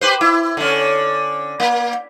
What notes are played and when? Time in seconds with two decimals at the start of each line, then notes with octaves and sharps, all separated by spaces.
0.01 G4 B4 C5
0.21 E4
0.57 D3 C#4
1.60 A#3